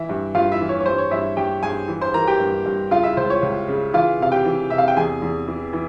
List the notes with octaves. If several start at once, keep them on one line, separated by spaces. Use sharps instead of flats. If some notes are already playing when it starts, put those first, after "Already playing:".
Already playing: E3 E4 E5
G2
G2 F4 F5
E4 E5
E3
C#5
C#5
G2 C5
C#5
G2 E4 E5
G2 G4 G5
G2 G#4 G#5
E3
C5 C6
E3 A#4 A#5
G4 G5
G2
G2
C#3 F4 F5
E4 E5
C#2 C5
C#5
C#2
C#3
E3 F4 F5
C3 F5
G4 G5
E3
C3 E5
F5
G5
E2 G#4 G#5
E2
E3
E3